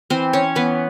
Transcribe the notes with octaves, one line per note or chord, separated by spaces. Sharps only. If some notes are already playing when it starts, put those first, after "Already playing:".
E3 C4 C5
C#4 C#5
E3 B3 B4